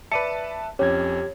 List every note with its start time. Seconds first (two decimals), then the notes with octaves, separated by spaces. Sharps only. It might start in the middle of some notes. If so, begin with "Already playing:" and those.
0.12 B4 D5 E5 A5 C#7 D#7
0.79 F2 C#4 G4 C#5 G#6